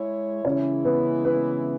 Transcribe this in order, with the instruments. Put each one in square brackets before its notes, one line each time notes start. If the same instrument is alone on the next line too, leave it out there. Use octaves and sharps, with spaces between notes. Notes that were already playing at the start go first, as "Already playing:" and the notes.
Already playing: [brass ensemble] G#3 E4 C#5
[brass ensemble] C#3 E3 G#3 E4 [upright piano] C#4 C#5
[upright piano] B3 B4
B3 B4